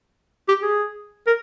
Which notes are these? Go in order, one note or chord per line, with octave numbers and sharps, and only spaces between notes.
G4
G#4
A#4